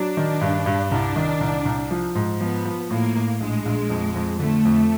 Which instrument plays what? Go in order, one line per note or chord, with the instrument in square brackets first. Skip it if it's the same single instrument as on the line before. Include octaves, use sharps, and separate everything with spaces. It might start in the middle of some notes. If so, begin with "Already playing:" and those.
Already playing: [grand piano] F#3 [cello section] D4
[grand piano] D#3
G2
G2
[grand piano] C2 [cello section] D4
[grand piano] D#3
C2
C2
F3
G#2
[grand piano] F3 [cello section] B3
[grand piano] F3
[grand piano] A2 [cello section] A#3
[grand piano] A2
[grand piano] A#1 [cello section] G#3
[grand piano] A#1
F2
F2
[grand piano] D3 [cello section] A3
[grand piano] F2